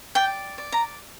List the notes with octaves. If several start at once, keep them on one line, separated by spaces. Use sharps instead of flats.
D5 G5
D5
A#5